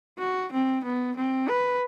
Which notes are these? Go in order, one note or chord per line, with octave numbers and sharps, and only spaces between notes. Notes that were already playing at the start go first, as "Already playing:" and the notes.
F#4
C4
B3
C4
B4